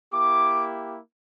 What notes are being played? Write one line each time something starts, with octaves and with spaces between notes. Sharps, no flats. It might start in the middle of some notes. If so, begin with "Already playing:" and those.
A#3 E4 G4 D6